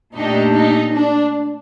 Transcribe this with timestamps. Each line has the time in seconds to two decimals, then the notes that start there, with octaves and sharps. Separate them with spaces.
0.15 A#2 A3 D4 D#4 G4
0.55 D#4
0.94 D4